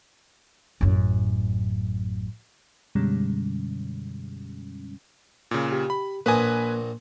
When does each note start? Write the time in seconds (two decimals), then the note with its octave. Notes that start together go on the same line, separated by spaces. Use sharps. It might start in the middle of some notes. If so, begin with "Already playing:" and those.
0.81 A1 F#2
2.95 F#2 B2 D3 G3 G#3 C#4
5.51 A#2 C#3
5.73 G4
5.90 B5
6.26 A#1 A#2 A#3 B4 G#5 D#6